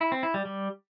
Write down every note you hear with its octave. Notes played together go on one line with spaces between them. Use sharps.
E4
C4
E4
G3
G3